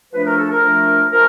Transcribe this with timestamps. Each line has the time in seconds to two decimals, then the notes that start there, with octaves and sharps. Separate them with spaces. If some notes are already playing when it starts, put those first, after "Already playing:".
0.13 F3 A3 D4 B4
0.25 A#4
0.38 A4
0.50 A#4
0.62 F3 A3 D4
1.12 F3 A3 A#4